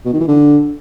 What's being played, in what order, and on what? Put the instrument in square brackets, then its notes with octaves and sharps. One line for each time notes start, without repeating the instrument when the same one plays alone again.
[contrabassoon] B2
D#3
E3
D3